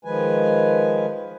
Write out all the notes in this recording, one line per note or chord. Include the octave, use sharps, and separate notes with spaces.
D#3 F3 G#3 B4 G#5